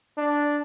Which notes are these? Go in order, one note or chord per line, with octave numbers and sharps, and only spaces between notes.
D4